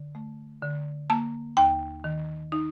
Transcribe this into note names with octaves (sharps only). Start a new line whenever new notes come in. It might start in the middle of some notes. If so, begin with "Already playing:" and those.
Already playing: D3
A3
D3
A#3 A5
D#2 G5
D#3
D#4